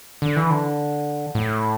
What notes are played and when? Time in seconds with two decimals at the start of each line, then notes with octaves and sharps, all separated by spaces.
0.22 D3
0.36 E3
0.50 D3
1.35 A2